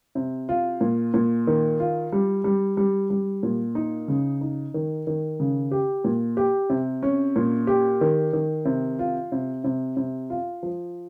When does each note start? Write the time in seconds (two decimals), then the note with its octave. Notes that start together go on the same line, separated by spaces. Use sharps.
0.15 C3
0.49 F4
0.81 A#2
1.14 A#2
1.47 D#3
1.80 F4
2.12 G3
2.44 G3
2.77 G3
3.10 G3
3.43 A#2
3.75 D#4
4.08 C#3
4.41 D#4
4.74 D#3
5.07 D#3
5.40 C#3
5.71 G4
6.04 A#2
6.37 G4
6.70 C3
7.03 C#4
7.36 A#2
7.67 G4
8.01 D#3
8.33 D#3
8.65 C3
8.99 F4
9.32 C3
9.64 C3
9.97 C3
10.30 F4
10.63 F3